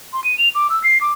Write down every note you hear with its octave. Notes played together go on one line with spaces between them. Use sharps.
C6
D#7
F7
D6
E6
C7
D6